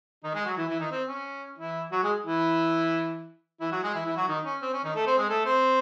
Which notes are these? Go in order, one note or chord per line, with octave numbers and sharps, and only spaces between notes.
D#3 D#4
G#3 G#4
F#3 F#4
E3 E4
E3 E4
D#3 D#4
C4
C#4
E3 E4
F#3 F#4
G#3 G#4
E3 E4
E3 E4
F#3 F#4
G#3 G#4
E3 E4
E3 E4
F#3 F#4
D#3 D#4
C#4
C4
C#4
D#3 D#4
A3 A4
C4 C5
G#3 G#4
A3 A4
C4 C5